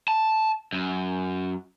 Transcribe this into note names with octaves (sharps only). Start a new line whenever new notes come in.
A5
F#2